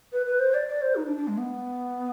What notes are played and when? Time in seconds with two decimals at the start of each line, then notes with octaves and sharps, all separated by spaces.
0.12 B4
0.26 B4
0.39 C5
0.54 D5
0.68 D5
0.81 C5
0.95 D#4
1.06 D4
1.17 D4
1.27 G#3
1.37 B3